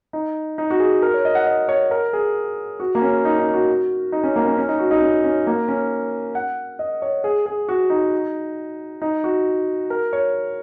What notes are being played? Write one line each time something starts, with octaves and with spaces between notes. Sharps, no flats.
D#4
D#4
F#4
G#4
A#4
C#5
D#5
F#5
D#5
C#5
A#4
G#4
F#4
A#3
C#4
D#4
D#4
F#4
D#4
C#4
A#3
C#4
C#4
D#4
F#4
D#4
C#4
C#4
A#3
C#4
F#5
D#5
C#5
G#4
G#4
F#4
D#4
D#4
F#4
A#4
C#5